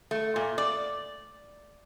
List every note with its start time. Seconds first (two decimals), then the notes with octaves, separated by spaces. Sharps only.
0.11 A3
0.36 A#2
0.58 D5